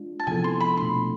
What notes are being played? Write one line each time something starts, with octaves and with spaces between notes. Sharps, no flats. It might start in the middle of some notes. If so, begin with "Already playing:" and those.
Already playing: G#3 D4 F4
A5
C3 F3 B3 E4 A4 G#5
C6
B5
B2 A3 D4 C6